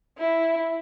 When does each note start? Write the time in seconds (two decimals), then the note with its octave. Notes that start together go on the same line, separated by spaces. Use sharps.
0.18 E4